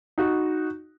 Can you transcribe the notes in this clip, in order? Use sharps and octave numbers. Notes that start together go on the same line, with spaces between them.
D#4 F#4